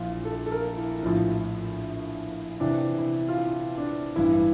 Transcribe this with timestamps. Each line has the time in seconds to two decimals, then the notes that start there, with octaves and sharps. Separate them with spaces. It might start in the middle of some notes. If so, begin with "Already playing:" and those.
Already playing: A#1 A#2 F3 E4 F4
0.25 A4
0.46 A4
0.52 A#4
0.77 E4
1.03 A#1 A2 F3
2.60 E2 C3 E3 D4
2.98 E4
3.29 F4
3.38 E4
3.78 D4
4.16 A1 G2 E3 E4